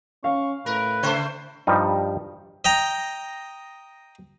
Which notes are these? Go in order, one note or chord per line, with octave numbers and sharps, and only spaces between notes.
C#4 F5 C#6
A2 A#4 B4
C#3 A3 C5
G2 F3 G3 D#4
D#5 G5 A#5